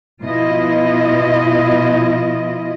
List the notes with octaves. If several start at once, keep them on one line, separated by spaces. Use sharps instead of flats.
B2 F3 E4 F4 D#5